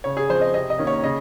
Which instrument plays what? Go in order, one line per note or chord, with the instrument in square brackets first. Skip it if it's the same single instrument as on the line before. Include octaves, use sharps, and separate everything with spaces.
[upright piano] C#3 C#5
G#4
F3 C4 C5
D#5
C3 D#5
D#5
D#3 A#3 C#4
C#5
C#3 D#5